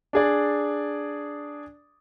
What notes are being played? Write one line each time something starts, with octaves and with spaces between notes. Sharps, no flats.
D4 G#4 D5